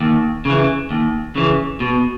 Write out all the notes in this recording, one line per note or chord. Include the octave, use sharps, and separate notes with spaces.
D#2
C#3 E3
D#2
C#3 E3
B2